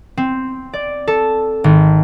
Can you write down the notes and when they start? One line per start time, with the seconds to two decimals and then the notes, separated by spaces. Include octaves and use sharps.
0.17 C4
0.73 D5
1.08 A4
1.64 G#1